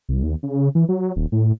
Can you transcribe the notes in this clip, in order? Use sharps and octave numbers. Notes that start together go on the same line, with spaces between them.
C2
D#2
C#3
E3
F#3
D#1
A2